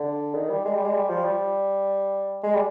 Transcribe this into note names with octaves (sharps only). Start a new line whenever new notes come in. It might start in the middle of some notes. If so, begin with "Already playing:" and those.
Already playing: D3
D#3
G3
G#3
G3
G#3
G3
F3
G3
G#3
G3